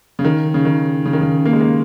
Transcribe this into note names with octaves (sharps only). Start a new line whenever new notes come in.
C#3
D#3
C#3
D#3
C#3
D#3
C#3
A#3
G#3
A#3